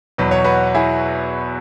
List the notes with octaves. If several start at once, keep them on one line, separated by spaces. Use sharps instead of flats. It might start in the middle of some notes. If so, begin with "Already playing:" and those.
E2 B2 F#3 B4
C#5
F#4 B4
E4 G#4